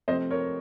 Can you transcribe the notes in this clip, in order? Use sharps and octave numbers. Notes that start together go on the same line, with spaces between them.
C3 F3 A3 C4 C5 D#5
A#4 C#5